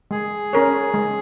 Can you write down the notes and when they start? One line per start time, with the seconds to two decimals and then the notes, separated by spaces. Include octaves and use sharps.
0.11 G#3 G#4
0.53 C#4 A#4 C#5
0.94 G#3